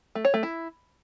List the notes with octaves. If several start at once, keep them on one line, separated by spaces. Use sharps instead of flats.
A3
C#5
A3
E4